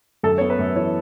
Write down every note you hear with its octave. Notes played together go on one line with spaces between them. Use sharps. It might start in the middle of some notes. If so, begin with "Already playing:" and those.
F#2 A4
B3 C#5
B4
F#2
E3 C#5